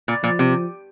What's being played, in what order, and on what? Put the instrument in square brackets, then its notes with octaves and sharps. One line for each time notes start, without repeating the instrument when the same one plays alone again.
[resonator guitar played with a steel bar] A#2
[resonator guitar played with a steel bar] A#2 [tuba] F3
[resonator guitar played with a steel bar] C3